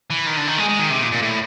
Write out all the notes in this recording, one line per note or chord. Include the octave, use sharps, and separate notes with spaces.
E3
D#3
D3
D#3
G#3
G#3
D#3
C3
A#2
A#2
A2